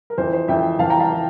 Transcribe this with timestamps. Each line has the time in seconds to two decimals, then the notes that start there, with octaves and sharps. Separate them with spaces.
0.10 A#4
0.17 F2 E3 C5
0.33 C5
0.48 F2 E3 E5 G5
0.79 F2 E3 F5 A5
0.90 G5 A#5
0.99 F5 A5
1.10 E3